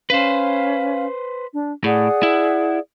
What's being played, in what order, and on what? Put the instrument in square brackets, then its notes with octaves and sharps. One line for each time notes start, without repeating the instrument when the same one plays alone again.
[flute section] C#4 F5 [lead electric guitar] B4 C5
[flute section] D4
[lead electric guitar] A2 [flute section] G#4 D5 F#5
[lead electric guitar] E4